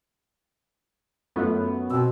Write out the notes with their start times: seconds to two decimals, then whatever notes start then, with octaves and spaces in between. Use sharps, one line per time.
1.36 F#2 A3 B3 F4
1.90 B2 C4 G5 E6